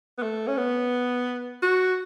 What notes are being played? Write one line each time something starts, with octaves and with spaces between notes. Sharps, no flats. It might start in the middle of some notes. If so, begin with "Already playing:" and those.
B3
A3
C#4
B3
F#4